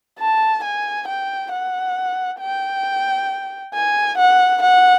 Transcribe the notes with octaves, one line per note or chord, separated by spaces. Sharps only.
A5
G#5
G5
F#5
G5
G#5
F#5
F#5